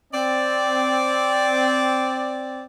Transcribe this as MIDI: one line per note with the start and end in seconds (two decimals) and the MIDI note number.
0.13 2.63 60
0.13 2.63 74